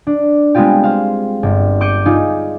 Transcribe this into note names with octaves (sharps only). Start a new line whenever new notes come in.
D4
G3 G#3 B3 C4 F4 G4
C5 F5
G1
D6 G6 C#7 D#7
D#4 F4 G#4